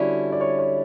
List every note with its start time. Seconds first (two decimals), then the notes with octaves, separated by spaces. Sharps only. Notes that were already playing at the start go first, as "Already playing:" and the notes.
Already playing: D3 G3 C#4 E4 F#4
0.32 D5
0.41 C#5
0.59 C#5